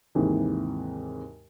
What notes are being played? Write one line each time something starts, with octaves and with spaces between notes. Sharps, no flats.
D#2 G#2 C3 E3